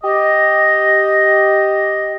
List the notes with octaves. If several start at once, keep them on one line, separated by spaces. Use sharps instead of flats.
G4 D#5